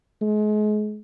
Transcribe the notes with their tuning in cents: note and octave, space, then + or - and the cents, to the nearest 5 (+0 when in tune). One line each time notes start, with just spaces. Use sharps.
G#3 +35